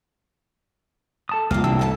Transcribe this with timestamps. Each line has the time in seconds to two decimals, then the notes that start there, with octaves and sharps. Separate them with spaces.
1.29 A4 A5 D#6
1.51 C2 A#3 F4 F6
1.64 C3 E3 A#3 D4 E6
1.79 F#2 D#4 E4 A4 A#4 A5